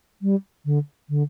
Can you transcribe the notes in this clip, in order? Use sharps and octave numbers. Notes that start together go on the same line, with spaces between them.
G3
D3
D3